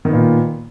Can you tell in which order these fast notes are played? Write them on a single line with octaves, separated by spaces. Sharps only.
D#3 B3 A#2